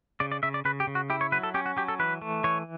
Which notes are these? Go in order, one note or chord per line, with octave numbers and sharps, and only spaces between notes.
C#3 D5
D5
C#3 E5
D5
C#3 B4
G4
C#3
F#4
E4 G4
C#5
F#3 B4
A4
C#4 G4
F#4
F#3 G4
A4
E3 B4
A3
E3 C#5